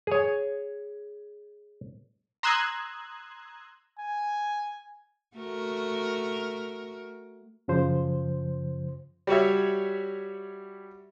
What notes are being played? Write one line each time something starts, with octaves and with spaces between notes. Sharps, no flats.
G#4 C#5
A#5 C6 D#6 E6 F#6 G#6
G#5
A3 F#4 A#4
F#2 C#3 F3 C5
G3 F#4 C#5 E5